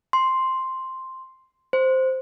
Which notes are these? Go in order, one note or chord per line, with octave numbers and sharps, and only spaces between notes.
C6
C5